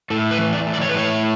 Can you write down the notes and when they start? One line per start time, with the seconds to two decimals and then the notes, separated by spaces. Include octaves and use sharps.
0.10 A2 A4
0.31 B4
0.38 E3
0.53 D5
0.67 A2
0.74 D5
0.81 C#5
0.89 B4
0.94 A2 C#5